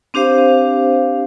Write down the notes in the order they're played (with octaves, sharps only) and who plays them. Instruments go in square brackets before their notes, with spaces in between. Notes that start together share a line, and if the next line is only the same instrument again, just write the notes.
[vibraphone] C4 D4 G4 C5 F5